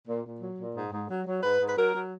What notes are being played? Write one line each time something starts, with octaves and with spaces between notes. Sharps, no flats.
A#2
A#2
F#3
A#2
G#2
G#2
F#3
F#3
G#2 B4
G#2
B4
F#3 A#4
F#3